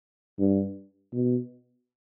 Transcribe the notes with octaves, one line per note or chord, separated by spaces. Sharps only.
G2
B2